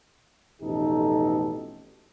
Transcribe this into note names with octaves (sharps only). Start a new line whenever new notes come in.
A1 F2 B2 D#4 G4 A4